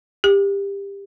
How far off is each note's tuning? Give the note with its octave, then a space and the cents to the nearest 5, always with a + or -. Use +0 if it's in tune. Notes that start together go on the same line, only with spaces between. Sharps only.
G4 +20